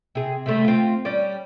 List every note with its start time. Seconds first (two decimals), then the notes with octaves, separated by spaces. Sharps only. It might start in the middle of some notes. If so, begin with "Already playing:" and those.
0.15 C3 G#4
0.46 C3 G3 A3
0.64 C4 F4
1.05 G3 C#4 D5